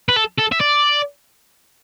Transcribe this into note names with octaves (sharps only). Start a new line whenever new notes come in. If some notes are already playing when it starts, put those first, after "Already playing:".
B4
A4
A4
E5
D5